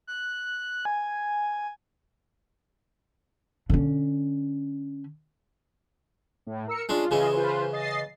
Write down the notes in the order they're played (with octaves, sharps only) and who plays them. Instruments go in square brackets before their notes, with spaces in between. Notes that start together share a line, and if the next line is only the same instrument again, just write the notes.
[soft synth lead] F#6
G#5
[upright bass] D3 C#4
[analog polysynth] A2
A#4 E6 C#7
[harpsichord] G#3 C#4 D4 [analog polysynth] F4
[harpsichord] C#3 E3 C#4 [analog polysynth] F4 G#4 D#5
[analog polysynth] F4 B4 C5
D#5 A6 C7